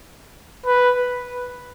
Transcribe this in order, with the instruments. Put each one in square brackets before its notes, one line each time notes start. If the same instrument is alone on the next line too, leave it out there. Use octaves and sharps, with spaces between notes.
[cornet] B4